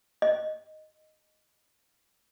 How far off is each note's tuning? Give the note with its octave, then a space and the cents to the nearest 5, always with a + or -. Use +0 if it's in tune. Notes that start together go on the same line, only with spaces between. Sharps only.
D#5 -5